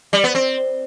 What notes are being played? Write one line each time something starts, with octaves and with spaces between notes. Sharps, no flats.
G3
B3
C4